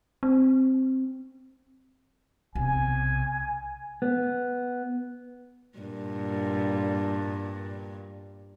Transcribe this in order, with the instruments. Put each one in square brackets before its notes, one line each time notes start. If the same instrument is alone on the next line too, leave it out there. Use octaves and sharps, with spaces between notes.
[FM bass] C4
[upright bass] B1 C3 [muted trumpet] G#5
[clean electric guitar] B3
[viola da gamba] G2 A#2